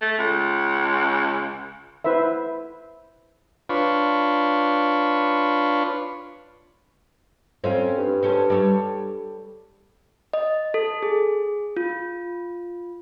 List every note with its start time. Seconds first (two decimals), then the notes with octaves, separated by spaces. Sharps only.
0.01 A3
0.18 C#2
2.04 E4 B4 C5 E5
3.69 D4 F4 B4 C#5
7.64 F2 C4 C#4 F4
7.97 G2
8.23 C#4 A4 C5
8.50 G3 A4 C#5
10.33 D#5
10.74 A4
11.03 G#4
11.77 F4